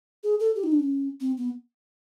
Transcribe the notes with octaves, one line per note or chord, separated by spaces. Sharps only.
G#4
A4
G4
D#4
D4
C#4
C4
B3